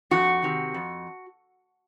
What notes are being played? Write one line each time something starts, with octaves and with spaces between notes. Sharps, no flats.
F2 F#4
C3 D#3
F2